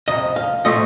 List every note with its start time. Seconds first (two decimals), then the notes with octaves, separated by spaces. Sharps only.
0.08 F2 C3 D#5
0.36 F5
0.65 A2 F3 A3 D#5